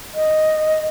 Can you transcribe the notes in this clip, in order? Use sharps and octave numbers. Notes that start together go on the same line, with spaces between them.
D#5